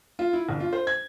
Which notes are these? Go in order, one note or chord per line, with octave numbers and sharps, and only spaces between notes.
F4
E4
G1
F4
C5
G#6